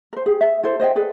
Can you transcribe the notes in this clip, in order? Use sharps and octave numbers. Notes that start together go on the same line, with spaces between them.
A#4 C5
G4 G#4
E5
E4 A4 C5
C5 D#5 E5 G5
G#4 A4 B4 D5